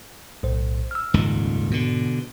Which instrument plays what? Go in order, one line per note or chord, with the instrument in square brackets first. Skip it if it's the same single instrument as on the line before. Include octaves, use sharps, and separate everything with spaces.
[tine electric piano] B1 A2 C5
E6 F6
[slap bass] D#1 C#2 D#3 [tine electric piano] G#2
[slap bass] B2 D3